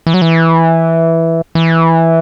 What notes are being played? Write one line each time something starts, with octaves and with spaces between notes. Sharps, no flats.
E3
F#3
E3
E3